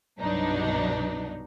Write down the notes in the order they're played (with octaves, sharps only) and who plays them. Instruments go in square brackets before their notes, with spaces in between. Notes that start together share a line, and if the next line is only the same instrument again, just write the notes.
[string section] C2 G2 B2 F#3 D4 D#4